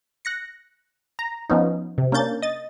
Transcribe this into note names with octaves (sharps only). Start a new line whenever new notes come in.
F#6 A#6 C#7
A#5
F3 B3 C#4 D#4
C3
A#3 C#4 D4 G6 A6
D#5 A6